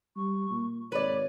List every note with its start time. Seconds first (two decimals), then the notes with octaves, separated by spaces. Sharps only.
0.16 G3 C#6
0.50 A#2
0.92 G#1 B4 C#5 D5